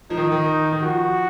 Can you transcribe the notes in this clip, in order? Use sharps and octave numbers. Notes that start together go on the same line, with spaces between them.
F3 D#4
D#3
D#3
D#3
F3 F#4